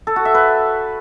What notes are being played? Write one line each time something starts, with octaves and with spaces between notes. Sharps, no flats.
A4
F#4
E5
B4